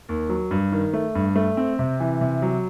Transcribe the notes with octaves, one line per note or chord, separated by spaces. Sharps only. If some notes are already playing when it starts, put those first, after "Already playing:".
D#2
F#3
G2
D#3
A3
G2
A3
C4
C3
E3
C3
F#3